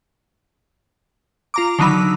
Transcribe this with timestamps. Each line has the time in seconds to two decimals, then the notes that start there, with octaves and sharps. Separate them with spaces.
1.54 F4 A#5 D6
1.79 D3 D#3 F#3 D#4 B5 E6